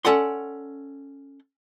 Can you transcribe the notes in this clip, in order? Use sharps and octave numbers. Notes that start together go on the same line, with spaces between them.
C#4 A4 D5 F#5 C6